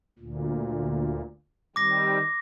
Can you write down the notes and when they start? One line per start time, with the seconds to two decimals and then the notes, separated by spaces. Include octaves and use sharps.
0.19 D2 A#2
1.76 D#3 G3 C4 D6 A#6